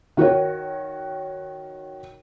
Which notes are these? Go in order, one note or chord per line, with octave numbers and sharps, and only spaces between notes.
D#3 F#4 A#4 C#5